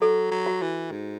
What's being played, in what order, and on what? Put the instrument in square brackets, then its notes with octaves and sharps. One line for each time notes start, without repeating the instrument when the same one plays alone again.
[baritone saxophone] F#3 [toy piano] A4
[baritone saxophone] F#3
[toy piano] F#4
[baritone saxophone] E3
G#2